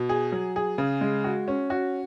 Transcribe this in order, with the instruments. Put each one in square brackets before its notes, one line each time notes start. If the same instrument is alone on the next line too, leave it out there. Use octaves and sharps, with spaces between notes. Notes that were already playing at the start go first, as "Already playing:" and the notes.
Already playing: [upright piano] B2
G#4
F#3
G#4
C#3
G#3
F#4
C#4
F#4